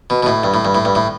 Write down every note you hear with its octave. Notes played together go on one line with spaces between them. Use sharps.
B2
B2
A2
G2
A2
G2
A2
G2
A2